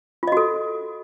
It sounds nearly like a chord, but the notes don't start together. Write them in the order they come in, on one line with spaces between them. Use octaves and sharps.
F4 D#5 F#4 A4